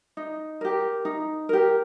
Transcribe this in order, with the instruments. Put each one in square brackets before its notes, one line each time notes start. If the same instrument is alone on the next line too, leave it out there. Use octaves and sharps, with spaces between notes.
[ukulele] D#4
G4 A#4
D#4
G4 A#4